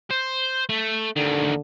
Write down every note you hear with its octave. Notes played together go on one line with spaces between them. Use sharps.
C5
A3
D2 D3 D#3